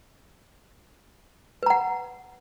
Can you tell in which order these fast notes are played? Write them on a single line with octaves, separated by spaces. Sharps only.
B4 A#5 F#5